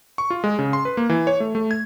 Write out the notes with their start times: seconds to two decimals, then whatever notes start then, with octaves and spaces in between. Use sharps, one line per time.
0.18 C#6
0.30 F4
0.44 G#3
0.59 C#3
0.73 C6
0.85 B4
0.97 A#3
1.09 E3
1.27 C#5
1.40 A3
1.55 A3
1.71 G#6